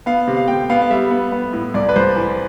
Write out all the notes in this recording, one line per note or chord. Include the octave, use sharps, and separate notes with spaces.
B3 F5
C3
F5
C3 G5
B3 F5
F5
G3 E5
B3
B3
A2
C2 D5
B4
C2 C5
E3